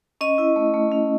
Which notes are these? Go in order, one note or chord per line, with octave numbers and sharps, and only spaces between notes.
C#4 D#5
E4
A3
A3
C#4